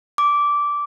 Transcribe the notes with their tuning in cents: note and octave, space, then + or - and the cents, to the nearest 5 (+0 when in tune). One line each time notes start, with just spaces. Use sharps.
D6 -10